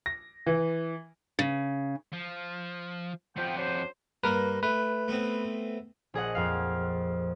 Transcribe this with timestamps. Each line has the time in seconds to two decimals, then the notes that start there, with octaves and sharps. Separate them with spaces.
0.06 A#6
0.47 E3
1.39 C#3
2.13 F3
3.37 F2 F3 B3 G5
3.56 F#3 D4 C5
4.24 G2 A#3 A#4 B4
4.63 A3 B4
5.08 A3 B3 C4
6.14 A#1 G#4 D#5 F#5
6.35 F2 F5